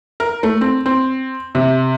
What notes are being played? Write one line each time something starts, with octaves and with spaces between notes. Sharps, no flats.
A#4
A3
C4
C4
C3